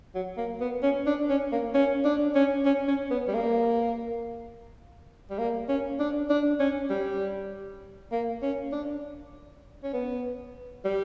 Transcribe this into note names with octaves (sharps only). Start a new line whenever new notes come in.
F#3
A#3
B3
C#4
D4
C#4
A#3
C#4
D4
C#4
C#4
C#4
B3
G3
A#3
G3
A#3
C#4
D4
D4
C#4
G3
A#3
C#4
D4
C#4
B3
G3